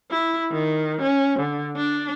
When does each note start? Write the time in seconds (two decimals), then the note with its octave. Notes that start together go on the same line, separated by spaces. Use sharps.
0.11 E4
0.52 D#3
1.02 C#4
1.40 D3
1.76 D4